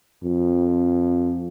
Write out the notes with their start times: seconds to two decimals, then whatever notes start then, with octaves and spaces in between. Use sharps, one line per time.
0.23 F2